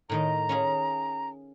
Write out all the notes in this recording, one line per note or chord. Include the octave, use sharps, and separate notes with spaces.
A2 D#3 D#5 A#5
C#4 F4 G#4